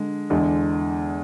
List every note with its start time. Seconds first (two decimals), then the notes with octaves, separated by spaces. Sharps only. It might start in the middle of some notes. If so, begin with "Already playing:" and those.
Already playing: D3 G#3
0.30 E2 D3 G#3